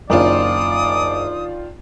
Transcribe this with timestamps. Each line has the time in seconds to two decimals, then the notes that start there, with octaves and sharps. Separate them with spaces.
0.10 F#1 D#3 D4 F4 D5 D#6